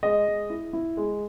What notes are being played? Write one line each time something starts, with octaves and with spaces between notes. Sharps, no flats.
G#3 D#5
G#3
E4
E4
G#3